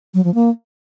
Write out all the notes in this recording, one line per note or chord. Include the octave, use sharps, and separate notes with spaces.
F#3
F3
A#3